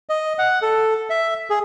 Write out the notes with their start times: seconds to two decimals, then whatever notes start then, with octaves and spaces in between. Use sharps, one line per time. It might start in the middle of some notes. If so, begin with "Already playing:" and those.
0.09 D#5
0.39 F#5
0.62 A4
1.10 E5
1.50 G#4